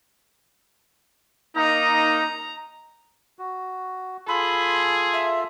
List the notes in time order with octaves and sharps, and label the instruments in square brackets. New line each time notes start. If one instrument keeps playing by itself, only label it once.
[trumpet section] A#3 D#4 [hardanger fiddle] A#5
[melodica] F#4
[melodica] F4 A4 C6 [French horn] G#4 [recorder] B5
[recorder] E5